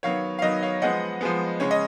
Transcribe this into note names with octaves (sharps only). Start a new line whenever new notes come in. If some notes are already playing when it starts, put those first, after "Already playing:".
D#3 F#3 B3 C#5 F5
F5
D#3 F#3 B3 D#5
C#5 F5
F3 G#3 B3 D#5 F#5
F3 G#3 B3
C#3 G#3 C#4 C#5
D#5